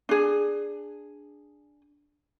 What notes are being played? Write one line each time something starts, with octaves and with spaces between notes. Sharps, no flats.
D4 G#4